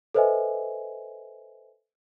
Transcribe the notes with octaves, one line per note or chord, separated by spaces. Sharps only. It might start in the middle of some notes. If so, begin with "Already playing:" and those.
A4 B4 C5 D#5 E5 G#5